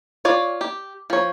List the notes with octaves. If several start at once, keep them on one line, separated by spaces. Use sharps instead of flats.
F4 C#5 D5
G4
F3 C#5